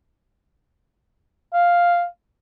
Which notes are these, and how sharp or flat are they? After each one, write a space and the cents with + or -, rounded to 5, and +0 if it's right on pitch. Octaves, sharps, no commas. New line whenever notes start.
F5 +0